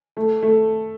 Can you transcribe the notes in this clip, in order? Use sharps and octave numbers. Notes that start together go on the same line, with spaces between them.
A3
A3